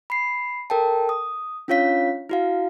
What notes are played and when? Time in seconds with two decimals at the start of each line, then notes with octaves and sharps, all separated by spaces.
0.10 B5 C7
0.70 A4 A#4 G5 A5
1.09 D#6
1.68 C#4 D4 F4 C#5 F5 B6
2.29 E4 F#4 F5